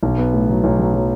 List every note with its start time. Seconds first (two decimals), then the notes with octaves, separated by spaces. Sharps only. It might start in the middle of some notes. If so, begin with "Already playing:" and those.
0.03 B1
0.18 B3
0.33 A2
0.49 F#3
0.64 B1
0.79 F#3
0.94 F#3